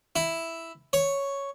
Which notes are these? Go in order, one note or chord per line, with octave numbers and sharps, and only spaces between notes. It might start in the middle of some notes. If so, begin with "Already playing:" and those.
E4
C#5